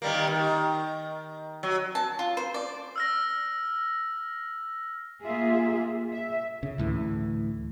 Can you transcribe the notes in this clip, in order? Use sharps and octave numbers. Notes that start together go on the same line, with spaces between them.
D#3 G3 A#3
D#3
F#3
A5
F4
C5
D5
E6 F6 A#6
A#3 F4 G#4 E5
E5
C#3
D2 A2 E3